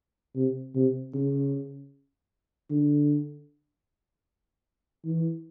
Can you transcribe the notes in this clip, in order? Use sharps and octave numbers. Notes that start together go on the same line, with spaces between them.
C3
C3
C#3
D3
E3